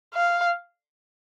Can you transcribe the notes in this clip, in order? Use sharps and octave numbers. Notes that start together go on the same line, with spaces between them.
F5